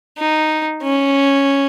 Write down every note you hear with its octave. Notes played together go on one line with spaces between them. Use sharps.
D#4
C#4